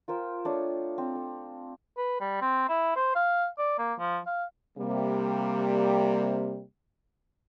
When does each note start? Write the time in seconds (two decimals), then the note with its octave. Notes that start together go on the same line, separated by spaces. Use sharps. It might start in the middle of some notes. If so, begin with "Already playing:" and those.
0.08 F4 A#4 C5 G5
0.45 A3 D4 C#5 D#6
0.98 C4
1.15 A4
1.97 B4
2.20 G3
2.41 C4
2.69 E4
2.96 C5
3.15 F5
3.58 D5
3.78 A#3
3.99 F3
4.26 F5
4.78 C3 G3 A#3